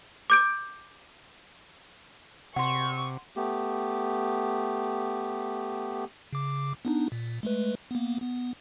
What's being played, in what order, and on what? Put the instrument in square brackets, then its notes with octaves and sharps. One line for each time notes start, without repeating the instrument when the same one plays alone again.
[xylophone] D6 G6 D7
[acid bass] C3 [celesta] F#5 C6 [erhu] C#6
[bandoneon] A3 B3 G4
[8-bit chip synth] C#3 D6
B3 D4 D#4
A#2
G#3 A3 B4
A#3 B3
B3